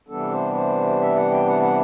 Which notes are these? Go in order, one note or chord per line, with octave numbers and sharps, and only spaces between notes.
C3 E3 G3 B3 D4 A4
C5
C5
E5
F#5
G5
F#5
F#5